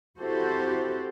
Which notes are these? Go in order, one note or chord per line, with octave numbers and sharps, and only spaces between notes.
C4 E4 F#4 G4 A4 C5